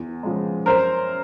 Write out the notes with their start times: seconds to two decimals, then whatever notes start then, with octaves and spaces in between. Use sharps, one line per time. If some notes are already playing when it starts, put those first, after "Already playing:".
Already playing: E2
0.23 C#3 F3 G#3
0.66 F#2 A#4 C5